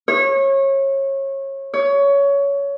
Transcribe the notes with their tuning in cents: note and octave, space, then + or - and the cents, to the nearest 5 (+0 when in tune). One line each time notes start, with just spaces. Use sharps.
C#5 -25
C#5 +20